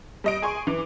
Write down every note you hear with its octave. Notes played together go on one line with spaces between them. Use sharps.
G3 D#5 D7
G#4 G#5 C6 C#6
E3 D6